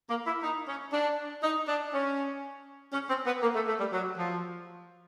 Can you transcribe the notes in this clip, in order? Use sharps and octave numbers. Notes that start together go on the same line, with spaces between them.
A#3
E4
D#4
C#4
D4
D#4
D4
C#4
C#4
C4
B3
A#3
A3
A3
G3
F#3
F3